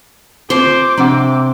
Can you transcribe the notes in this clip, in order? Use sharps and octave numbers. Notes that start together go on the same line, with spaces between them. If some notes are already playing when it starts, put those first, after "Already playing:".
C4 F4 C5 D6
C3 C4 D4 F#5